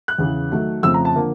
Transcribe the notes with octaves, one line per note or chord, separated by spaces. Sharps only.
F#6
E2 C#3 E3
D#3 F#3 A3
F2 C#3 F3 A3 C4 E6
A#5
A5
D3 F3 A#3